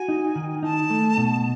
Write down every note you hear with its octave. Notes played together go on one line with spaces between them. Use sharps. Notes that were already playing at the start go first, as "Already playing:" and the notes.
Already playing: F#4 G#5
D#4
D#3
D#4 A5
A3
B2